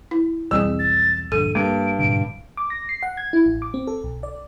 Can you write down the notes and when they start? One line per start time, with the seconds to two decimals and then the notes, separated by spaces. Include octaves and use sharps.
0.11 E4
0.51 B1 E2 G3 C4 G#4 E6
0.79 A6
1.32 A#1 G2 D3 A4 D#7
1.55 G2 G#3 A#3 D7
1.99 G#2 B2 D3 D7
2.57 D6
2.70 A#6
2.89 C7
3.03 F#5
3.17 G#6
3.33 E4
3.46 A1
3.62 D6
3.74 C4
3.87 A4
4.04 B1
4.23 D5